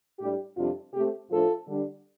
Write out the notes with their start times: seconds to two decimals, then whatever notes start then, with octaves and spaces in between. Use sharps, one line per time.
0.20 A2 G3 D4 G4
0.57 F2 C3 G3 D4 F4
0.93 C3 A3 C4 G4
1.30 A2 F3 A3 D4 F4 A4
1.67 D3 G3 D4